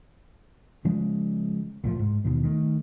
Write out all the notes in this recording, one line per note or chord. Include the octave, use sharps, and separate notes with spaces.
C#3 F3 G#3 C#4
C2 A2 F3
G#2
D#2 B2 D#3
D#3 G#3 A3